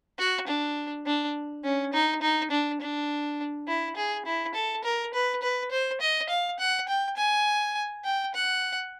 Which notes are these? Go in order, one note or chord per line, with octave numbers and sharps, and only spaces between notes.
F#4
D4
D4
C#4
D#4
D#4
D4
D4
E4
G#4
E4
A4
A#4
B4
B4
C5
D#5
F5
F#5
G5
G#5
G5
F#5